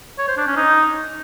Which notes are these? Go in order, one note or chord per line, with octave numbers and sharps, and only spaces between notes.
C#5
C5
D4
C#4
D#4